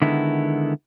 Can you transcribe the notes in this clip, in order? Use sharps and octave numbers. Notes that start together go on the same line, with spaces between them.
D3 D#3 G#3 B3 E4